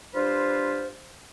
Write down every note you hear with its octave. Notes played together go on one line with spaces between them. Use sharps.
G3 D4 F4 B4 C5